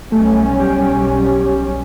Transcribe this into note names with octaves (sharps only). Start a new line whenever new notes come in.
B1 G3 A3 C#4
G4